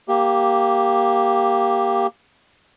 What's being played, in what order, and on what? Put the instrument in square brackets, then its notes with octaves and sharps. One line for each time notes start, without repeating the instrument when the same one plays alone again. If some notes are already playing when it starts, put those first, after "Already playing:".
[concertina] A#3 G4